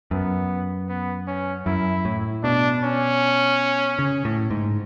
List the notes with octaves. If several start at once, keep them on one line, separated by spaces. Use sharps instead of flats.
F#2 B3
B3
C#4
F#2 E4
A2
B2 D4
C#4
C#3
A2
G#2